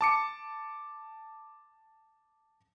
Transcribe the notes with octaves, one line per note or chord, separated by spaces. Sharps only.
A5 D6 C#7